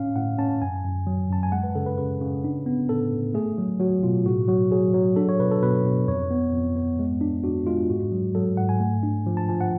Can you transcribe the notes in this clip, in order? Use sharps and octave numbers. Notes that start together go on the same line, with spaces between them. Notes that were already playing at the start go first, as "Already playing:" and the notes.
Already playing: A2 C#4 F5
A2 F#5
C#4 A5
F#2 G#5
F#2
F#3
F#2 A5
G#5
G#3 F#5
B4
C#3 A4
B4
C#3 B4
C#3
D4
B3
A2 A4
A2
A3 G#4
F#3
F#3 F#4
B2 F4
A2 F#4
F#3 F#4
F#3 G#4
F#3
D4 A4
C#5
B2 B4
A4
B2 B4
B2
F2 C#5
B3
F2
B3
G#3
D4
D4 F#4
G#3 F4
G#2 F#4
F#3
F#3 A4
G#2 F#5
G#5
A3
D4
F3
A5
F3 G#5
F#5